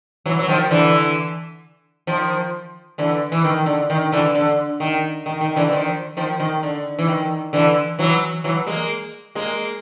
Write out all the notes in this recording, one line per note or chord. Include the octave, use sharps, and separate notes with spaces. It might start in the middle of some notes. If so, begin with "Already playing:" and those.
E3 F#3
F#3
D#3 F3
D3 E3
D#3 F3
D3 E3
E3
D#3
D3
D#3
D3 E3
D3
D#3
D#3
D#3
D3 E3
D#3 F3
D#3 F3
D#3
D3
E3
D#3
D3 E3
E3 F#3
E3 F#3
G#3 A#3
G#3 A#3